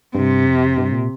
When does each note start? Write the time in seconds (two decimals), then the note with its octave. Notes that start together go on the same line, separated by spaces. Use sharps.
0.15 G2 C3
0.47 F2
0.77 G2
0.93 A#2